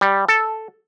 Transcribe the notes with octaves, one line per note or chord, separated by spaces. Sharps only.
G3
A4